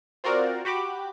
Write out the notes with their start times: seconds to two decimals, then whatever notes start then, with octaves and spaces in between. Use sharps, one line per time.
0.24 C4 F4 F#4 A#4 C5 D5
0.65 F#4 G4 B5 D6